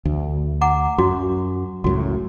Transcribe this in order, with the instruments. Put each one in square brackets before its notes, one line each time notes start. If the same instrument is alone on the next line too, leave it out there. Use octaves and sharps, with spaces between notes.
[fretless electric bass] D2
[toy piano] F#5 A#5 D6
[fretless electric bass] F#2 [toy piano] F#4
[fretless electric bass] C#2 F#2 A2 [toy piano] F#4